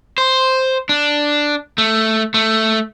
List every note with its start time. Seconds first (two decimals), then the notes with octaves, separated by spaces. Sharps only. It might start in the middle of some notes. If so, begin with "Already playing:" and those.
0.18 C5
0.89 D4
1.78 A3
2.34 A3